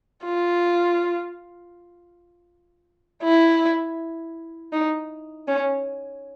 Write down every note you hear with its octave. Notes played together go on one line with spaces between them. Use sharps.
F4
E4
D#4
C#4